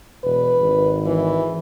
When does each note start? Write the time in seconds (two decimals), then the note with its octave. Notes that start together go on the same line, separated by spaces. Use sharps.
0.24 E1 B4
0.61 G#1
1.06 E3